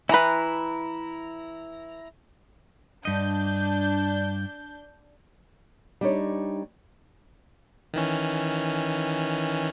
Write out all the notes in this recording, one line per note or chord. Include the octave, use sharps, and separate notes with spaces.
E3 E4 B4 A#5
G2 D4 D#5 G6
G3 D4 D#4 C#5
D#3 E3 C#4